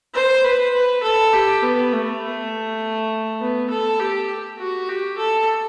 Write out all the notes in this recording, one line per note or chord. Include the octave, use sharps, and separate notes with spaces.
C5
B4
B4
A4
G4
B3
A3
B3
A4
G4
F#4
G4
A4